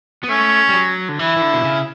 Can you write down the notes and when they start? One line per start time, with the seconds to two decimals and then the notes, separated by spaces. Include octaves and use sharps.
0.23 B3
0.29 A3 C#4
0.69 G3
0.74 F#3
1.09 D3
1.19 E3 E4
1.37 E3
1.42 D3
1.53 B2
1.64 C#3